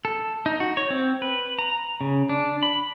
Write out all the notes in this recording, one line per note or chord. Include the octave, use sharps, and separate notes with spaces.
A4
D#4
F#4
C#5
C4
B4
A#5
C#3
D4
B5